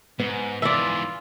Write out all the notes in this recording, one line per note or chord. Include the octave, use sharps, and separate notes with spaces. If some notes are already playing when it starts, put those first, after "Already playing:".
G#2 B3
G#2 E3 F4 D5 E5